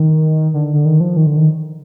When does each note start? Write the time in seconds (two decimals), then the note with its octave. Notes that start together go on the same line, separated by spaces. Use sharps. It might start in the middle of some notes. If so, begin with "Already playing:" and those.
Already playing: D#3
0.54 D3
0.73 D3
0.85 D#3
1.00 F3
1.17 D#3
1.27 D3
1.37 D#3